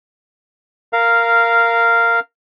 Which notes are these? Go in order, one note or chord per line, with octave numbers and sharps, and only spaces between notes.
A#4 F5